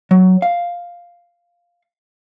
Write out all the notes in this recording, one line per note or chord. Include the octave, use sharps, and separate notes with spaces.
F#3
F5